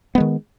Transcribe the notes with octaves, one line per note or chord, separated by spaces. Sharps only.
D#3 G#3 B3